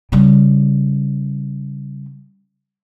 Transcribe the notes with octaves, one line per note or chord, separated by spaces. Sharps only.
C#3 G3